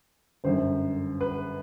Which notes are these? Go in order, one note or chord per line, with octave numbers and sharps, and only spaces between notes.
G1 F#2 D3 C5
B4